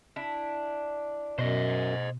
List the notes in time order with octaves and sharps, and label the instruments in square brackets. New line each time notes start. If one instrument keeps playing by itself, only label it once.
[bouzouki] D4 E4
[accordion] F#2 [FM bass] B2 [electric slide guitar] C5 D#5